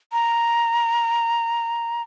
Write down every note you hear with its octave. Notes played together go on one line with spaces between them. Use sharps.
A#5